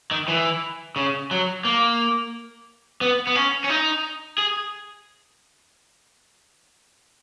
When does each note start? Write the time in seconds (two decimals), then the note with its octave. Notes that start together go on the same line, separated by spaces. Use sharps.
0.11 D#3
0.28 E3
0.96 C#3
1.31 F#3
1.65 A#3
3.01 B3
3.27 B3
3.35 C#4
3.64 C#4
3.69 D#4
4.38 G#4